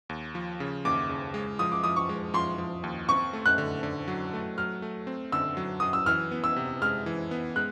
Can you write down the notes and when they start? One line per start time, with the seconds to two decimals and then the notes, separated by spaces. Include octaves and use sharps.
0.09 D#2
0.35 F3
0.60 C#3
0.85 D#2 D6
1.09 C#3
1.34 G#3
1.59 F3 D#6
1.72 D6
1.84 F3 D#6
1.96 C#6
2.09 G#3
2.34 F3 C6
2.58 F3
2.84 D#2
3.08 C4 C#6
3.33 A3
3.46 F#6
3.58 D3
3.83 D3
4.08 F#3
4.33 A3
4.58 F#3 F6
4.82 A3
5.07 C4
5.32 D3 E6
5.57 F#3
5.80 F#3 D#6
5.93 E6
6.06 E3 F6
6.31 B3
6.44 E6
6.56 C3
6.82 G#3 F6
7.06 E3
7.31 B3
7.56 G#3 F#6